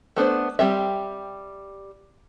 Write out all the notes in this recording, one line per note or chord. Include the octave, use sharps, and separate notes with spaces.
A3 B3 D4 C5
G3 C4 G4 E5